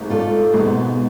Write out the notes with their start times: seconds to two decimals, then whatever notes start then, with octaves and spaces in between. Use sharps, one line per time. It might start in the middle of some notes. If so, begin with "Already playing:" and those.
Already playing: G#1 G#2
0.10 A3 F4 A4 D5
0.54 G#1 G#2 B2 G#3 B3